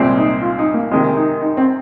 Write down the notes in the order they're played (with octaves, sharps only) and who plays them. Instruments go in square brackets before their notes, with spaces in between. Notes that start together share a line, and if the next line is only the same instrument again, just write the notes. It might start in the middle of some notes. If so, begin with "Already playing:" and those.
Already playing: [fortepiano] C2 A#2 G#3 C4
[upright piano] D#4
F4
D#4
A#3
[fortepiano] C3 D#3 G#3 [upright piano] C4
[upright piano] D#4
D#4
C4